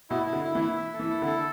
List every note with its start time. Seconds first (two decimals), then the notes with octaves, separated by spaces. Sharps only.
0.10 B2 E4
0.27 E4
0.33 D3
0.44 E4
0.55 E3
0.61 E4
0.77 E5
0.94 A4
0.99 E3
1.10 E4
1.22 D3
1.27 A4